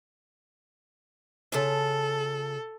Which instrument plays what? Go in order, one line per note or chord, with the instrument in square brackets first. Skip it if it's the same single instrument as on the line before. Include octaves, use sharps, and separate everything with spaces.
[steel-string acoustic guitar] C#3 F4 A5 [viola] A4